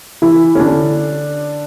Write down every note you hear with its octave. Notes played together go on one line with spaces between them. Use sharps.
E3 E4
C#4
D3 D4